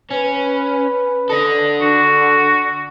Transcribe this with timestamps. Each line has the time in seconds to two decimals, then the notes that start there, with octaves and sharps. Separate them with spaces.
0.11 C#4 B4
1.30 D4 A4 D#5
1.81 D3 F#4